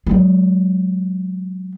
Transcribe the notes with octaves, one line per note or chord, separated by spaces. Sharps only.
F#3 G#3